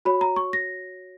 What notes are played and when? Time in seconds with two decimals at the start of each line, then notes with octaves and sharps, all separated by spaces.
0.05 F#4 C#5 B5
0.21 A#5
0.36 C#6
0.53 A#6